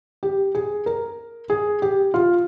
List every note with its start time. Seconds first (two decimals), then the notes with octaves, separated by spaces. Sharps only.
0.23 G4
0.55 G#4
0.86 A#4
1.50 G#4
1.82 G4
2.14 F4